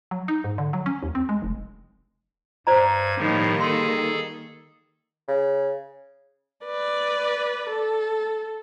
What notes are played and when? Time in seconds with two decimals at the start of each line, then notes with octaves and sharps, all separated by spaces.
0.11 F#3
0.28 D#4
0.44 G#2
0.58 D3
0.73 F#3
0.86 C#4
1.03 D#2
1.15 C4
1.29 G#3
1.42 F1
2.67 G2 C5 D5 A#5 G#6
3.17 A2 D#3 F3 G3 A#3
3.60 G#4 A4 C6
5.28 C#3
6.65 B4 D5
7.69 A4